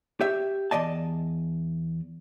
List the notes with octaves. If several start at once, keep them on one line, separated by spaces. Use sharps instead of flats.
G4 C#5 E5
E2 D5 D#5 A5